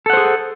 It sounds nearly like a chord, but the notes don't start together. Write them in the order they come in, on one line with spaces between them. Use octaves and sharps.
A4 F#5 C5 G#4